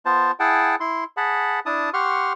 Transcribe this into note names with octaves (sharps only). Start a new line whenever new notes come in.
B3 F4 C5 A5
E4 G#4 F#5 G5 A5
E4 C6
G#4 F#5 A5 B5
D4 E4 A5 D#6
G4 F#5 C6 C#6 F6